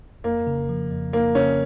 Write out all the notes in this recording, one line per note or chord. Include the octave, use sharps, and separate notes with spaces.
F2 A#3
C#3
F3
F2
F2 A#3
C#3 C#4